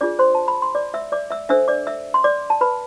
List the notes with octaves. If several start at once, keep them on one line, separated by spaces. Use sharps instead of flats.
D4 F4 G#4 D5 D6
C5 C6
A5
B5
C6
D5 D6
E5 E6
D5 D6
E5 E6
D4 A4 C5 E5 E6
D5 D6
E5 E6
C6
D5 D6
A5
B4 B5